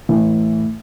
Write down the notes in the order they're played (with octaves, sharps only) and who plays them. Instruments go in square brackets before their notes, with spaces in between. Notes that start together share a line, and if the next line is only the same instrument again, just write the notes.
[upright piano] A2 E3